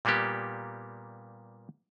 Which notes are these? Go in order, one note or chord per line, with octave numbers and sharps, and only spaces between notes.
A#2 G3 A#3 B3 G4